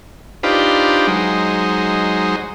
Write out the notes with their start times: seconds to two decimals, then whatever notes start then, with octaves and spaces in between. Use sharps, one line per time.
0.43 D4 D#4 F4 G4 B4 C5
1.07 F#3 G#3 D#4 C5